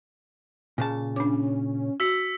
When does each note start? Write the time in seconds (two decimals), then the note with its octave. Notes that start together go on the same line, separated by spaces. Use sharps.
0.78 A#2 C#3 A5
1.16 C#4 D4 D6
2.00 F#4 E6 B6 C#7